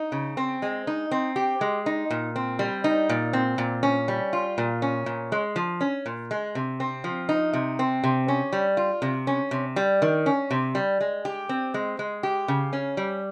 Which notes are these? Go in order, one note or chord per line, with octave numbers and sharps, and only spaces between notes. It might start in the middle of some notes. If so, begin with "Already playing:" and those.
Already playing: D#4
C#3
C4
G#3
D#4
C4
G4
G#3
D#4
A#2
C4
G3
D#4
A#2
C4
A#2
C#4
G3
F4
A#2
C#4
A#2
G#3
F3
C#4
A#2
G#3
C3
C4
F3
D#4
C3
C4
C3
C#4
G3
F4
C3
C#4
C3
G3
D#3
C#4
C3
G3
G#3
G4
C4
G#3
G#3
G4
C#3
C#4
G3